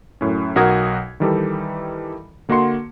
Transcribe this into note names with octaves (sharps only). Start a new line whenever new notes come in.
F#2 A2 C#4
B1 D#4 F#4 A#4 D#6 G#6
D#3 E3 G3 D#4 G4 A4
D3 A#3 F#4 D#5 C6 C#7